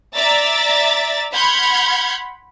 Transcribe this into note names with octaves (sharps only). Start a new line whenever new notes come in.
D5 E5 A#5 A6 B6
F#5 B5 C6 F6 G6 G#6